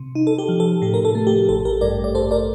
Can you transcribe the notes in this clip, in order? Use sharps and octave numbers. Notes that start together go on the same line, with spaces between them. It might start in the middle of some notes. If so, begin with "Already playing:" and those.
Already playing: C3
D#4
A4
G4
F3
A4
A2 G4
A#4
A4
A3
G4
A1 A4
G4 A#4
G2 A#4 D5
D5
A1 A4 C5
A#4 D5